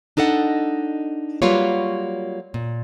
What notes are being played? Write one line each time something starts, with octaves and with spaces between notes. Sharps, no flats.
D4 D#4 A4 D#5 F#5
F#3 G3 A#3 F4 B4 C#5
A#2